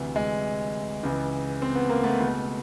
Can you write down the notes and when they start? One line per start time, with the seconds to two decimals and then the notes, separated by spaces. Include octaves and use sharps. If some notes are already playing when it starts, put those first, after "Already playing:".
Already playing: D2 C3 E3
0.16 G#3
1.03 C#2 C#3 E3
1.62 C4
1.75 B3
1.90 A#3
2.03 A3 B3
2.20 C#2 B2